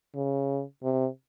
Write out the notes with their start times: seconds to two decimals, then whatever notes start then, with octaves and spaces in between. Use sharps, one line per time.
0.15 C#3
0.83 C3